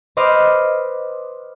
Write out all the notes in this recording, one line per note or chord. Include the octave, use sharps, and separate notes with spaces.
B4 C5 D#5 D6 F6